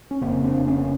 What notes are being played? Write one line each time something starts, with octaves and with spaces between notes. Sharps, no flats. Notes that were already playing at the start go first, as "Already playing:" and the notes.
C#4
F1 E2 C#3 A#3 C4
C4 D4
B3 C#4